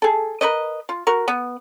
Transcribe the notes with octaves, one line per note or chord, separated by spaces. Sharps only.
G#4 A4
A#4 B4 C#5 D#5
F4
F#4 A#4
B3